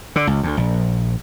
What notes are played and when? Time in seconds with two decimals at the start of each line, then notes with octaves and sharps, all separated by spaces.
0.16 D3
0.27 C#2
0.43 D2
0.57 A#1